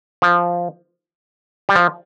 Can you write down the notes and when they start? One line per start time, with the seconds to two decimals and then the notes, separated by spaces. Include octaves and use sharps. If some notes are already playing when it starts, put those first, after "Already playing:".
0.22 F3
1.69 G3
1.76 F3